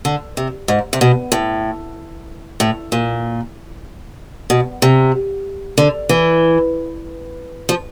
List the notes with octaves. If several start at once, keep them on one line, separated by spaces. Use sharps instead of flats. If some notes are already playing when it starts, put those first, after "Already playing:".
D3
C3
G#2
C3
B2
A2
A2
A#2
B2
C3
D3
E3
F3